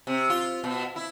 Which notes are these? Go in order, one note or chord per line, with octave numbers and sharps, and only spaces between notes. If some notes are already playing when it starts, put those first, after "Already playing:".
C3
F4
B2
E4